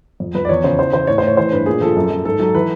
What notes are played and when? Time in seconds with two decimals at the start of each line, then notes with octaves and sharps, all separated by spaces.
0.20 F2
0.35 F2 B4
0.45 D5
0.49 E2 C#5
0.64 C#3 C5
0.79 E3 C5
0.93 E3 C5
1.07 A2 C#5
1.18 C5
1.23 A2 C#5
1.37 E3 C5
1.52 G2 B4
1.66 A#2 G#4
1.81 F3 A4
1.97 F#2
2.10 F#2
2.25 G#2 A4
2.39 F#3 A4
2.54 E3 B4